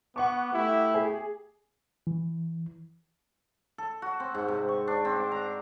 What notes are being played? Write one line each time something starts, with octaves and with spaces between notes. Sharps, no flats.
B3 F#5 C#6 D6
A3 E4 G4
G#4
E3
A4
F#4
C4
G#2
C3
C#6
D4
C4
D6
A#5